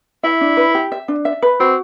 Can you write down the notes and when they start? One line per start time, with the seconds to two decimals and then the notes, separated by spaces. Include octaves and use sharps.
0.23 E4 E5
0.41 D4
0.57 B4
0.75 G4
0.92 E5
1.08 D4
1.25 E5
1.42 B4
1.60 C4 F#4